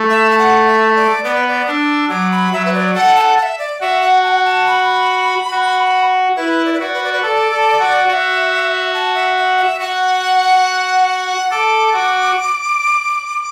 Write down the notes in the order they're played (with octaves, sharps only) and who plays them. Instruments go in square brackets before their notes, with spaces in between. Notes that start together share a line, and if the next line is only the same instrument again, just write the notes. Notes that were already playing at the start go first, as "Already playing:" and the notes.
Already playing: [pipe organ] A3
[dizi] E5
A5
F#5
E5
D5
[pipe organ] B3 [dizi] D5
[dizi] B4
D5
[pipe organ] D4 [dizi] F#6
[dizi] E6
[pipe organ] F#3 [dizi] D6
[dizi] B5
[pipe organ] F#3 [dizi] E5
[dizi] B4
D5
[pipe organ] A4 [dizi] F#5
[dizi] A5
F#5
F#5
E5
D5
[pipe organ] F#4 [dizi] E5
[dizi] F#5
A5
F#5
A5
B5
[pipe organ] F#4
[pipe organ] E4 [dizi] B4
[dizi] D5
B4
[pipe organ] F#4 [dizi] D5
[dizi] B4
D5
B4
[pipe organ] A4 [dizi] D5
[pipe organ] A4
F#4
[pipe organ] F#4 [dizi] F#5
[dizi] E5
A5
E5
E5
F#5
E5
[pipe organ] F#4 [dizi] F#5
[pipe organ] A4 [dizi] D6
[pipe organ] F#4